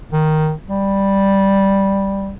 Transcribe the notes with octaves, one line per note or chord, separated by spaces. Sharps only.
D#3
G3